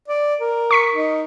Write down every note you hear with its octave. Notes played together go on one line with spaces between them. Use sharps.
D5
A#4
C#6 B6 C#7
D#4